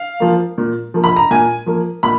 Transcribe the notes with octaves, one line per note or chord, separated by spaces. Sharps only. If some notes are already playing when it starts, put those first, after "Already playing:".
Already playing: F5
F3 A#3
A#2
F3 A#3
B5
A#5
A#2 G#5
F3 A#3
A#2 B5